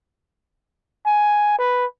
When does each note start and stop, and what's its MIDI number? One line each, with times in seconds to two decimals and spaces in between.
1.06 1.54 80
1.58 1.85 71